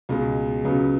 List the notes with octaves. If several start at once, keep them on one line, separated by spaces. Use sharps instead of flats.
C#2 B2 G#3
C#2 C#3 F#3 B3